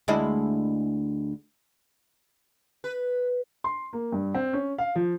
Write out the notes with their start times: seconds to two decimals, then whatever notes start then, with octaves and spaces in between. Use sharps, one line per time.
0.08 D2 G#3 E4
2.84 B4
3.64 C6
3.93 A#3
4.12 G2
4.34 C4
4.53 C#4
4.78 F5
4.95 F3